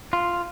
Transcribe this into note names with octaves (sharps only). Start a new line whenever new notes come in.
F4